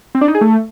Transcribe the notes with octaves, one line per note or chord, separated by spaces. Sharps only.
C4
D4
D#4
G#4
A3